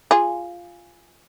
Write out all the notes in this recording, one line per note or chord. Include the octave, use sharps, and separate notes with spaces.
F4 G#4